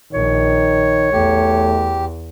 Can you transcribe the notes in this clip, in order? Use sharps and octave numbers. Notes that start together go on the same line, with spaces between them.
A#1 D#3 C#5
E2 A3 G4